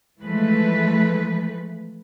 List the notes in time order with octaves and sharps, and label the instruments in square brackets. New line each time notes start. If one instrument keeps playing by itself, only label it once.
[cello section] E3 F3 G#3 A3 B4